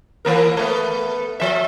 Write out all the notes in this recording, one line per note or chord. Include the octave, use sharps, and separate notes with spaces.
E3 A#3 A#4
A3 B3
F3 E5